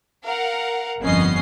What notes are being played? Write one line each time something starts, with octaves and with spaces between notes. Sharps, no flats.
A#4 F5 F#5
G1 F2 B3 C#4 D#5 C7